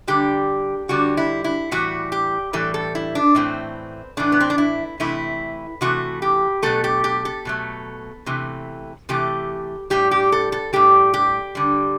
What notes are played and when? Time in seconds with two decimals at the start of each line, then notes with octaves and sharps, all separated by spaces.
0.07 D3 G3 G4
0.89 D3 G3 F#4
1.17 E4
1.44 E4
1.71 A2 E3 G3 F#4
2.12 G4
2.53 A2 E3 G3 A4
2.74 A4
2.95 E4
3.15 D4
3.35 A2 E3 A3 C4
4.17 A2 E3 A3 D4
4.32 B3
4.40 C4
4.50 D4
4.58 E4
5.00 C3 E3 A3 E4
5.81 C3 E3 A3 F#4
6.22 G4
6.62 B2 F#3 A3 A4
6.84 G4
7.04 G4
7.25 A4
7.45 B2 F#3 A3
8.26 C3 E3 A3
9.09 C3 E3 A3 G4
9.90 A2 G3 G4
10.11 G4
10.32 A4
10.52 A4
10.73 A2 G3 G4
11.14 G4
11.55 D3 G3